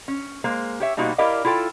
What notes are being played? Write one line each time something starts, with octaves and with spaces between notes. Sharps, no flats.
C#4
G#3 A#3 C5
G4 C#5 E5
B2 G3 A#3 D#4 F#4 C5
E4 G4 A#4 D5 D#5 F5
E4 F4 A4 G5